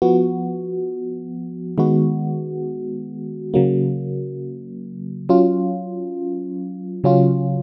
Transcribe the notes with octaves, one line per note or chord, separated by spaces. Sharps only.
F3 B3 F#4
D#3 G#3 B3 F#4
C#3 F#3 A#3
F#3 C#4 F4
C#3 F#3 C#4 F4